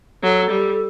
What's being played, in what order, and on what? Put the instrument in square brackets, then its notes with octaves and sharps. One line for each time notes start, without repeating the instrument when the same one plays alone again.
[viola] F#3 [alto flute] A4
[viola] G3